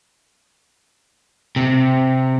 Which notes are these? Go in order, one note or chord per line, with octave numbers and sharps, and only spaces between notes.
C3